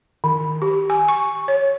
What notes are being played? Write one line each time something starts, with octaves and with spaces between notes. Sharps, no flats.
D#3
G4
G#5
C#6
C#5